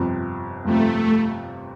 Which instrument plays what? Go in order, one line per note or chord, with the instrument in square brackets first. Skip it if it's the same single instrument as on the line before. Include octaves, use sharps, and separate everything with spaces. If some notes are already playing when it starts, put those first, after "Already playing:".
Already playing: [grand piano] G1 F2 C3 F3
[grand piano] G1 F2 C3 F3 [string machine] A3